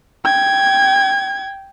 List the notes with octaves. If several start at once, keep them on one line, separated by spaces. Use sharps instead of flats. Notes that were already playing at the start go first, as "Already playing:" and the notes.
G5 G#6